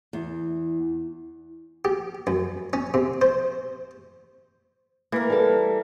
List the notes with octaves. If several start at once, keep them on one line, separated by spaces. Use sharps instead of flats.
E2
G4
F#2
C#4
C3
C5
E3 A#3 A#4
G3 A4